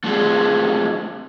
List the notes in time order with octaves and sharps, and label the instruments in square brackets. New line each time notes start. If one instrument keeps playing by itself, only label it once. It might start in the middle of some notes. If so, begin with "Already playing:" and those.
[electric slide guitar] A3 C4 D4 F4 G4 G#4